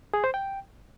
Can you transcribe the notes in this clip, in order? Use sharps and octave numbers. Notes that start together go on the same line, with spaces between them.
G#4
C5
G5